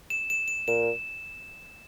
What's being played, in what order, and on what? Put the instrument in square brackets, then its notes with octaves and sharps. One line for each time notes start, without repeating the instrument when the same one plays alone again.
[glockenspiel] E7
E7
E7
[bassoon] A#2 [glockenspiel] E7